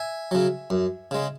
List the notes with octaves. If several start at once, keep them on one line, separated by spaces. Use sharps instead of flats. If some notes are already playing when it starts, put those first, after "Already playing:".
Already playing: E5 G#5
C#3 F#3
F#2
C#3 G#3